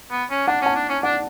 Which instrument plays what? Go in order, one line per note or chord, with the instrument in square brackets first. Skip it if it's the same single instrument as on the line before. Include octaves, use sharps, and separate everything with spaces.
[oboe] B3
C#4
[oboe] D4 [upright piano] F#5 A5
[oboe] C#4 [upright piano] F#5 A5
[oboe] D4
C#4
[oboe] D4 [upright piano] D5 F#5